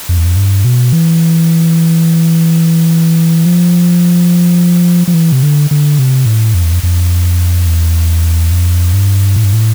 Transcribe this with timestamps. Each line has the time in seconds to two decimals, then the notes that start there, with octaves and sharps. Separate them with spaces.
0.09 F2
0.17 E2
0.25 F2
0.36 G2
0.64 B2
0.93 E3
3.46 F3
5.08 F3
5.14 E3
5.32 C3
5.43 D3
5.71 D3
5.99 C3
6.26 A2
6.54 F2
6.63 E2
6.72 F2
6.83 F2
7.67 E2
8.51 F2
8.93 G2
9.36 A2
9.44 G2
9.53 A2